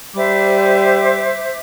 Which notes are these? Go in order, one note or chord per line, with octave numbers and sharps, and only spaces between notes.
G3 C5 E5 D6